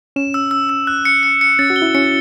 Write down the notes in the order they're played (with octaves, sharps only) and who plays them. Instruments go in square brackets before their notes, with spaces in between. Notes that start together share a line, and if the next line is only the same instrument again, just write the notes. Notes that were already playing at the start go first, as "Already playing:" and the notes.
[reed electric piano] C#4 [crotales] E7
[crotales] E6
E6
E6
F#6
C#7
C#7
C#7
[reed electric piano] C#4 [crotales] A6
[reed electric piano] F#4
[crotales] G7
[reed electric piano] E4
[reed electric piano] C#4 [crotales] C#7